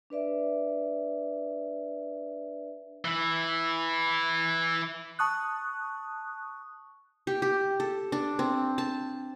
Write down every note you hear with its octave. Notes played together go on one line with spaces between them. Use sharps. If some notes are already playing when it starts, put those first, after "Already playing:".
D4 B4 D5 E5
E3 E4
A5 C#6 D#6 F#6
G4
G4
A4
D4
C4
A5